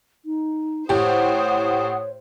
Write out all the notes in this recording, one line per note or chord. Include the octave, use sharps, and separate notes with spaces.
D#4
A2 G4 C5 C#5 F#5 D#6